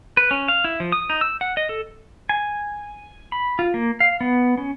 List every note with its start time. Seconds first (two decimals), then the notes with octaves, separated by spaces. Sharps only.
0.17 B4
0.31 C#4
0.48 F5
0.64 E4
0.80 F3
0.92 D#6
1.10 D#4
1.21 E6
1.41 F#5
1.57 D#5
1.69 A4
2.29 G#5
3.32 B5
3.59 F4
3.74 A#3
4.00 F5
4.21 B3
4.57 C#4